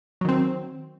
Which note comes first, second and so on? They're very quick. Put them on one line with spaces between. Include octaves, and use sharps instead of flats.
F#3 D#3 C4